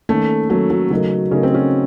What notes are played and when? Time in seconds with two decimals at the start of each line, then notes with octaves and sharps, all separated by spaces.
0.09 D#3 A3 A#3 C#4 A4
0.50 D#3 F#3 A#3 C#4 A4
0.70 F#3
0.90 C#3 F#3 A3 D#4 A#4
1.31 C#3 A3 C#4 D#4 A#4
1.43 C4
1.54 C#4